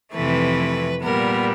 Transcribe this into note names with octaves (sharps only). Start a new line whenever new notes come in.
F2 C3 E3 A3 B4
A#2 G3 B3 A#4